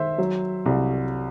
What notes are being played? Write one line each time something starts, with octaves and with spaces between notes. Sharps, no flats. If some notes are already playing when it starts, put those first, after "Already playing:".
Already playing: D#3 C5 E5
F#3
C2